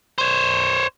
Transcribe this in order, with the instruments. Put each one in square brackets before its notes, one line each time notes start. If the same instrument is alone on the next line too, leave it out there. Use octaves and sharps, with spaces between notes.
[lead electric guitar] C5 C#5